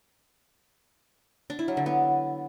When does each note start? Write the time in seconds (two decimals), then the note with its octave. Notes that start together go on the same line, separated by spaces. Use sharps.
1.50 D4
1.59 E4
1.68 F#3
1.77 D3
1.86 B3